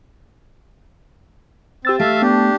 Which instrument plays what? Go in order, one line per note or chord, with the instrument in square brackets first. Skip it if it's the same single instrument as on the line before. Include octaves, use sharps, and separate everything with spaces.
[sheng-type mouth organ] C4 [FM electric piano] G4 E6 A6
[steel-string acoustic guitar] A3 [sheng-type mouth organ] E5 F5
[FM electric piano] B3 [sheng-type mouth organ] D4 G4